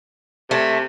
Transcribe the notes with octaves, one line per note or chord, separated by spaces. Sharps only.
C3 A3